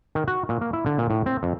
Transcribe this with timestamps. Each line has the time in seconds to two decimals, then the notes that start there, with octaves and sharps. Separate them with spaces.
0.15 D#3
0.28 F#4
0.49 A#2
0.61 A#3
0.73 E4
0.86 D3
0.98 A#2
1.10 A2
1.26 C4
1.43 F2